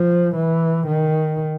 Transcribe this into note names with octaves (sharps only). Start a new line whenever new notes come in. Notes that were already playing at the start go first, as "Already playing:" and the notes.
Already playing: F3
E3
D#3